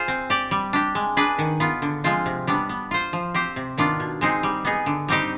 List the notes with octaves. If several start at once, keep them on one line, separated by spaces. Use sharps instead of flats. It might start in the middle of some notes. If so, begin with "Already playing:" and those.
Already playing: F4 G#4 C5 F5
C4
G4 D5
G3
D4 G4
G#3
D4 G#4 B4
D#3
B3 F4
D3
F3 G#3 C4 F4
C3
G3 B3 D4
B3
F4 C5
F3
C4 G4 C5
C3
D#3 B3 D4 F4
B2
G#3 C4 D#4 G#4
G3
B3 D#4 G#4
D3
G3 C4 D#4 G4